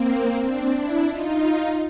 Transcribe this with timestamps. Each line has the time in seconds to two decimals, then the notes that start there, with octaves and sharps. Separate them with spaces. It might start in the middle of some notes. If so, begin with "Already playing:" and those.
Already playing: A#3 C4
0.41 C4 D4
0.75 D4 E4
1.08 D#4 F4